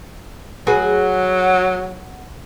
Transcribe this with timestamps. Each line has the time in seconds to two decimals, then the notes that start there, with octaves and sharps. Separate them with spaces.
0.67 F#3 F#4 G#4 B4